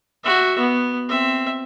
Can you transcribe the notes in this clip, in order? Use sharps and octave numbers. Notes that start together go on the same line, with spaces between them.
F#4 E5
B3
C4 E5